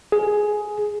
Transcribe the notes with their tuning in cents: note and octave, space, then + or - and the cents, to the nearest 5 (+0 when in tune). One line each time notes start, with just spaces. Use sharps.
G#4 +10